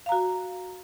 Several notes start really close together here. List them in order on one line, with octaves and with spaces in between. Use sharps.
F5 A#5 F#4